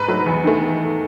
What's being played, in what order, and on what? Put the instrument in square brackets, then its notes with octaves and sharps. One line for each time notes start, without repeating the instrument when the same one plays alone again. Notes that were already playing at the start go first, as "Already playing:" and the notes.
Already playing: [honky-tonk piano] G#2 B4
F#3 A3
E2
D#3 A3